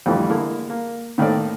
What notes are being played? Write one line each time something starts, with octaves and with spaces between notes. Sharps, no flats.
F2 A2 D3 E3 G3
D3 G#3 A#3 E4
A#3
A2 D#3 A#3 C4 A4 D5